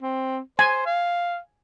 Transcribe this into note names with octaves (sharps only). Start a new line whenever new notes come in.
C4
C5 G#5
F5